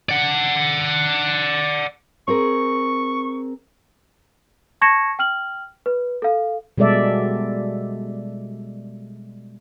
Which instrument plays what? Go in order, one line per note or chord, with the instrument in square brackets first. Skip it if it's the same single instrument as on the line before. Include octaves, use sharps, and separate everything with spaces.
[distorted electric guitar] D5 F#5
[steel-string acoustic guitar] C4 G#4 A#4 [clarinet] C#6
[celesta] A5 C#6 G#6 A#6 C#7 E7
G5 F6 F#7
B4
A4 F5
[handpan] B2 G3 G#3 A4 D5 E5